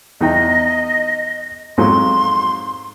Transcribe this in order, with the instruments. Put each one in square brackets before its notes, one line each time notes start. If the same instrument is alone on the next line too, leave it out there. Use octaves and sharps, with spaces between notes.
[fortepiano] E2 D#4 G5 [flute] D#5
[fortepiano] F2 G#2 F#3 [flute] C6